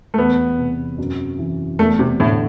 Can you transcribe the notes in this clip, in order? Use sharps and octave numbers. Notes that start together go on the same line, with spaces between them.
A3
E2 B3
C3
F#2
E3
E2 A3
C3
A2 D3